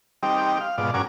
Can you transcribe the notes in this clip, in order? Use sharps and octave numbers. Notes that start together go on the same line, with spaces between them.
G3 C4 D#4 G4
F5
G#2 B2 F4 D5
G2 C#4 F#4 A#4 G#5 D6